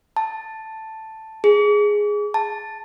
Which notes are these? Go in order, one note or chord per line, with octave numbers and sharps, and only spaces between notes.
A5
G#4
A5